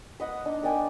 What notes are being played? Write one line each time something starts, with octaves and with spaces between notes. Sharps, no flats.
B4 D#5 F#5
D4 D#4
A#4 D5 G5 G#5